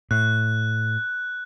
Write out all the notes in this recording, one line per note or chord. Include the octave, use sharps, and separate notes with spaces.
A2 F#6